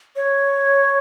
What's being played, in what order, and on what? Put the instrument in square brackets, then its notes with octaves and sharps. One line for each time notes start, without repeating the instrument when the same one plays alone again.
[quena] C#5